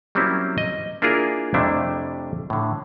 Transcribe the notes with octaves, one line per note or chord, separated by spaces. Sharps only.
F#3 G3 A#3 C4 C#4 E4
D#5
A#3 D4 E4 F4 G#4 A#4
F2 C3 G3 A3 D4 E4
A2 D3